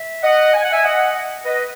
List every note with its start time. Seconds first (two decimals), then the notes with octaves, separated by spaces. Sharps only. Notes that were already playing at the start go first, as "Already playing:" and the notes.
Already playing: E5
0.23 D#5 F#5
0.54 G#5
0.63 F#5
0.72 E5 G#5
0.84 D#5 F#5
1.45 B4 D#5